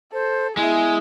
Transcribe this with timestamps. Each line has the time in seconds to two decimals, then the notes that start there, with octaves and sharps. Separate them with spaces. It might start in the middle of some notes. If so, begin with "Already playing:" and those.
0.13 A4 C5
0.57 G#3 B3 E4 G#4 E5 G#5